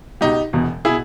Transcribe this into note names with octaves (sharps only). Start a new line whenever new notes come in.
C#2 B2 D#4 G4
E1 E2 B2
B2 E4 G#4